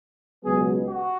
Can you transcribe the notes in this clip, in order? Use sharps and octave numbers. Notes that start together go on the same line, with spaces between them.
C#2 B2 F#3 B3 G#4
F#4